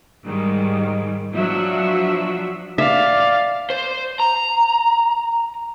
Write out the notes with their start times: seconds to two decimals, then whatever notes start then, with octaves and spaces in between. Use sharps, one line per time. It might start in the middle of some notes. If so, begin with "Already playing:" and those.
0.25 G#2 D#3 G3
1.34 F3 F#3 D4 F#4 E5
2.78 D5 E5 F5
3.70 C5
4.20 A#5